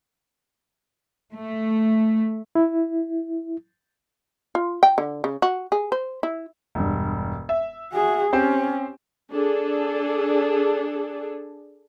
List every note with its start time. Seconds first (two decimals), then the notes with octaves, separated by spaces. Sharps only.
1.33 A3
2.55 E4
4.55 F4
4.83 G5
4.98 D3
5.24 C#3
5.42 F#4
5.72 G#4
5.92 C5
6.23 E4
6.75 E1 G2
7.49 E5
7.93 F#4 G#4
8.33 C4 C#4 G4 C5
9.32 D4 G#4 A4